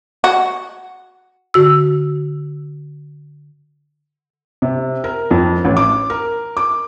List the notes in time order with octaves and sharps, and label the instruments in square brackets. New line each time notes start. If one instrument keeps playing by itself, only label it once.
[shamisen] F#4
[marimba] D3 F#4 E6
[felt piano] C3
A#4
F2
A1
D6
A#4
D6